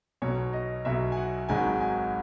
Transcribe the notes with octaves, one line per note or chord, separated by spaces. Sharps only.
B1 B2 F#3 C#5
D#5
B1 B2 F#3 E5
G#5
F#5
G#1 G#2 D#3 F#3 G#5
G#5